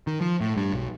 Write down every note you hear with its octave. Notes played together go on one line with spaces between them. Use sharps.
D#3
F3
A2
G2
B1